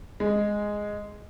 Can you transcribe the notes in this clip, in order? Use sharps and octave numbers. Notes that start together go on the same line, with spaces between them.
G#3